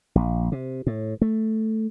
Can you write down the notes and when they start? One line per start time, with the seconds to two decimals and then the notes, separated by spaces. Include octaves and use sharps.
0.15 A#1
0.52 C3
0.87 A2
1.22 A3